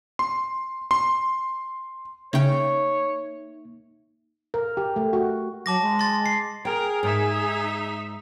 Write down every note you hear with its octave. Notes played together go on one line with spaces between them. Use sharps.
C6
C6
C#3 A#3 D#4 C#5 E5 G5
A#4
G4
A3
F#4
F#3 A5 D6 A#6
G#3
C6 A6
C7
G#4 A#4 G5
G#2 D#4 E5